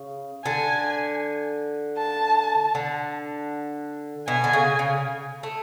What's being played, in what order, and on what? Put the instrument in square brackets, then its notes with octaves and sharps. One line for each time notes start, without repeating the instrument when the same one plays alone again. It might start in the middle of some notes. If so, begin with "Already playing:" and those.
Already playing: [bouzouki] C#3
[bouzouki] D3 [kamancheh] G#5
[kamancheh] A5
[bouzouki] D3
[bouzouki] B2 [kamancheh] G#5
[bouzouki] D3
C#3
C#3
A3